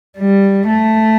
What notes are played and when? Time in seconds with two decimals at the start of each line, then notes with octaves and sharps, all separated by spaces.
0.18 G3
0.67 A3